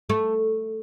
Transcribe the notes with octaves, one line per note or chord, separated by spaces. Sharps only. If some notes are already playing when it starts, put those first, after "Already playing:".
A3